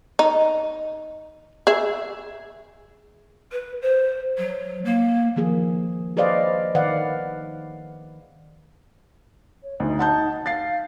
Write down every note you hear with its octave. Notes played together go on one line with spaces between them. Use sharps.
D#4
G#4 E5
B4
C5
F#3
A#3
D#3 F3 A#3 G#4
G#4 B4 C5 D5 D#5 F5
D#3 B4 D5 F5 F#5
C#5
D2 D#4
F#5 A5 G6
F5 A6 C7